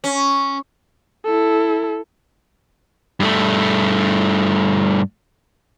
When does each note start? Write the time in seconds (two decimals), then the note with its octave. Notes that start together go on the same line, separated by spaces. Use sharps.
0.04 C#4
1.25 E4 A4
3.20 G2 A3